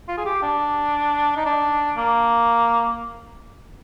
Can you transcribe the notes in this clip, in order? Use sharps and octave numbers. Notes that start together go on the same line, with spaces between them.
F4
G#4
G4
D4
D#4
D4
A#3